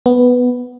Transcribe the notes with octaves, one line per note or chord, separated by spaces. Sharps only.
B3